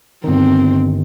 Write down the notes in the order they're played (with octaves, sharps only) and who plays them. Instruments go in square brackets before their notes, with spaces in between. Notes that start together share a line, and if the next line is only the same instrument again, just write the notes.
[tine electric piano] G1 D#3 [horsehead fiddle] C4